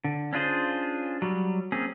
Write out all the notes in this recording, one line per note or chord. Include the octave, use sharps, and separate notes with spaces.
D3
C#4 D4 F4 G#4 C5
F#3 G3
A#3 C4 C#4 G#4